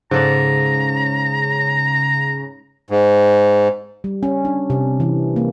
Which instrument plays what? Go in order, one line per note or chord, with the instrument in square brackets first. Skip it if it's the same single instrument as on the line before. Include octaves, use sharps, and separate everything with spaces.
[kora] G#2 A4 D5 [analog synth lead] C#3 [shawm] A#5
[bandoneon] G#2
[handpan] G3
C#4
D4
C3
E3
A#3